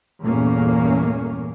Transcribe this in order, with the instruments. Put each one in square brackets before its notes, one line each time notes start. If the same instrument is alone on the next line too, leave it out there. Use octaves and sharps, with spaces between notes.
[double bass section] E2 G2 A#2 A3 A#3 C#4